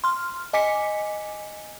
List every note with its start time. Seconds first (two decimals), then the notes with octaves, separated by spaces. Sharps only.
0.04 C6 F6
0.53 D#5 G#5 D6 B6 C#7